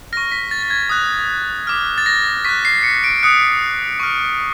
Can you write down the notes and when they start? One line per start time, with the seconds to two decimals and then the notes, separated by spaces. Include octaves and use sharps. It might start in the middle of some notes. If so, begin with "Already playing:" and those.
0.13 F6 A#6
0.17 C#6
0.32 B6
0.51 A6
0.63 A6
0.70 G#6
0.90 D#6 F#6
1.67 D6 F6
1.98 A6
2.06 A#6
2.45 C#6 F#6 B6
2.65 C7
2.83 C#7
3.04 D7
3.19 D7
3.23 D#6 F#6 C#7
4.00 C#6 F6